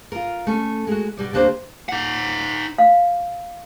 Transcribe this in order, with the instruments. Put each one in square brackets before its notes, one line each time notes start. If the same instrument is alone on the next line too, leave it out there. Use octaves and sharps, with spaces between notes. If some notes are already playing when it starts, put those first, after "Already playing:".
[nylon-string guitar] F4 A#4
A3 C#4
G#3 F#4
B2 G3 D5
D2 A#3 D4 G4 C5
[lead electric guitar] D#4 F#5
[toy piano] F5